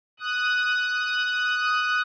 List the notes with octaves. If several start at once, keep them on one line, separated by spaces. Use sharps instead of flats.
D#6 F#6